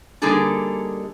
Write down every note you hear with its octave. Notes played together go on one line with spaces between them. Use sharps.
D3 G3 A#3 D#4 G#4 A4